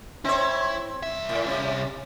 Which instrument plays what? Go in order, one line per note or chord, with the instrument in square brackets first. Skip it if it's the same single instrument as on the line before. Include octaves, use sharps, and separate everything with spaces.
[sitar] C4 C#5 [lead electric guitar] E4 E5
[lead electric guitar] C2 E5
[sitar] A2
C3